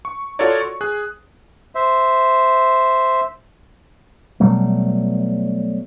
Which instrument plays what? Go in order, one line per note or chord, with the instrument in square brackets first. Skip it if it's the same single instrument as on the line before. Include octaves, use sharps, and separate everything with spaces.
[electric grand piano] C#6
F4 F#4 A4 A#4 C#5 D5
C#6
G#4 F#6
[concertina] C5 E5
[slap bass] B2 F#3 G3 A3